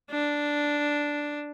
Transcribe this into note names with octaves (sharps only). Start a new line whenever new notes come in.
D4